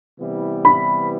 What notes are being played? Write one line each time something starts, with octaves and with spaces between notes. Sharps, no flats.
C3 E3 G3 B3 E4
B5